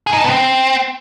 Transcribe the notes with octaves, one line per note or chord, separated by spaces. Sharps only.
G#4
D#4
A4
B3
C4